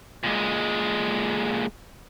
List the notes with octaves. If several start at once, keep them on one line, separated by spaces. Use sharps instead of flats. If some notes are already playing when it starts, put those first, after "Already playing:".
A#2 G#3